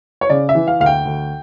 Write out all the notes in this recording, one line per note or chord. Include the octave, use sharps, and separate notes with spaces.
C#5
C#3 D5
E5
E3
F5
D2 F5
G5
D2